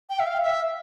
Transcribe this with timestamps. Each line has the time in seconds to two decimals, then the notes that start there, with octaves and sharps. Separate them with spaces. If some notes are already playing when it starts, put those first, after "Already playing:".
0.10 G5
0.19 E5
0.27 F5
0.43 E5